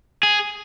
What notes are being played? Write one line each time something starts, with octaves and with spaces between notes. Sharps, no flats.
G#4